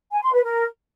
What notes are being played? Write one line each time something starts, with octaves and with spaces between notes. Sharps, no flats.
G#5
C6
B4
A#4